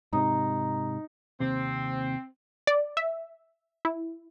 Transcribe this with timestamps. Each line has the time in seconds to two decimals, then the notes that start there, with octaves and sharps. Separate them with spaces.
0.13 G#2 C3 D#4
1.40 D#2 C3 C4
2.67 D5
2.97 E5
3.85 E4